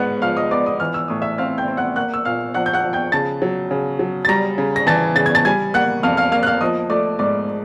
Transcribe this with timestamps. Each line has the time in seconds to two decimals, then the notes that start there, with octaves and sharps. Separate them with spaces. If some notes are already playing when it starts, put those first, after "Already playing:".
Already playing: G#2 B3 F#5 F#6
0.22 F3 F5 F6
0.37 D#5 D#6
0.51 B3 D5 D6
0.66 D#5 D#6
0.80 E3 F6
0.94 E6
1.08 A2 D#6
1.22 E5 E6
1.38 C4 F5 F6
1.58 G5 G6
1.68 C4
1.77 F#5 F#6
1.96 A#3 F#5 F#6
2.14 E6
2.25 A#2 F5 F6
2.54 F3 F#5 F#6
2.66 G6
2.73 F#5 F#6
2.84 F3
2.93 G5 G6
3.12 C#3 A5 A6
3.42 F#3
3.71 C#3
3.99 F#3
4.25 A6
4.28 G3 A#5 A#6
4.58 C#3
4.76 A#6
4.87 E3 A5 A6
5.16 C#3 A6
5.26 G#6
5.35 A5 A6
5.45 G3 G#5 G#6
5.74 A#3 F#5 F#6
6.03 F2 F5 F6
6.17 F5 F6
6.32 A#3 F5 F6
6.43 F#6
6.47 F5 F6
6.61 F3 D#5 D#6
6.90 A3 D5 D6
7.19 G#2 D5 D6